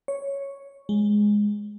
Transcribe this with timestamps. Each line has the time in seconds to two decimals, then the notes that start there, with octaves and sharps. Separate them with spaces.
0.08 C#5
0.89 G#3